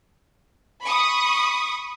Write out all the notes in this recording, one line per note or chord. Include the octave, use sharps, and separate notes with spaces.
B5 C#6 D#6